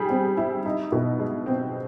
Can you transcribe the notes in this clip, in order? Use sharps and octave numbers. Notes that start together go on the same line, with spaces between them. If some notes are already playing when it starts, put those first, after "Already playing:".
Already playing: G3 G#4
C4
E4
D#4
B2
G#3
C4